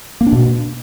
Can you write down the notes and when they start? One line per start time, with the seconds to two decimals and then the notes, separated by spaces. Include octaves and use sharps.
0.21 A#3
0.27 D4
0.32 B2